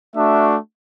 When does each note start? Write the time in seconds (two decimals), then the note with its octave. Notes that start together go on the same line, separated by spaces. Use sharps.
0.15 A3 D4 F#4 E5